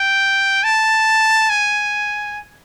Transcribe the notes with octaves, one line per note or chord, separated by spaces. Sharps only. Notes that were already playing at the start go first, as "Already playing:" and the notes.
Already playing: G5
A5
G#5